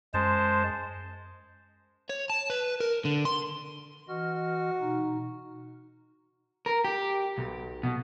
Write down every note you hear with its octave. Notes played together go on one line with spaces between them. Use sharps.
F#2 G#3 C5 A5
C#5
A5
B4
A#4
D3
C6
E3 F#4 D#5 F6
B2 D#4
A#4
G4
B1
B2